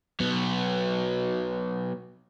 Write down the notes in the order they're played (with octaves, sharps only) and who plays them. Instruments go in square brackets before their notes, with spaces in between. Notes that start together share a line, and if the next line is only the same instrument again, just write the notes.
[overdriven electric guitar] F#3 B3